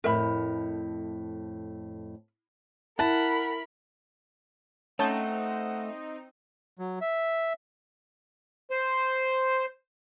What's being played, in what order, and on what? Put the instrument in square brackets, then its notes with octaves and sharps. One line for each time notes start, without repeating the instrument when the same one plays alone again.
[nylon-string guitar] F2 A2 [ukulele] A#4 E5 B5
[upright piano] E4 [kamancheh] A#4 B5 [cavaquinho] F#5 A5
[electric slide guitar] A3 [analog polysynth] C4 D#4 [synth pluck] C#4 A5 G6 [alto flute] F#5
[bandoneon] F#3
E5
[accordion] C5